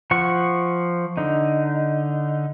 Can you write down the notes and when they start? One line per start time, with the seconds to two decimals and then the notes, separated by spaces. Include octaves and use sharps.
0.11 F3 F#5 C#6
1.17 D3 D#4